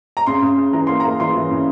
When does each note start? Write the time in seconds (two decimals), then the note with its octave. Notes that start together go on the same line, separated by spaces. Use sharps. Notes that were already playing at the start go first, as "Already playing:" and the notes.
0.17 A#5
0.26 C#3 C6
0.42 C#3
0.57 C#3
0.73 E3 A#5
0.87 A#3 C6
1.00 A#3 A#5
1.20 E3 C6
1.36 E3
1.51 C#3